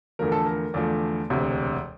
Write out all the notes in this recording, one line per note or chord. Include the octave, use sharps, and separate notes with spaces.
E2 D3 F3 A3 A#4
A4
A#4
E2 D3 F3 A3 D5
E1 D2 C3